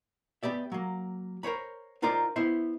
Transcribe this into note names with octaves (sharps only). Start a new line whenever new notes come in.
B3 G4 D5 E5
F#3 A#3
A#4 C5 C#5 B5
D#4 F4 A#4 C5 D5
B3 E4 C5 E5